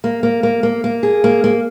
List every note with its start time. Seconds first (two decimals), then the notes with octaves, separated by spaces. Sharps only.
0.04 A#3
0.23 A#3
0.43 A#3
0.63 A#3
0.84 A#3
1.03 G#4
1.24 A#3
1.44 A#3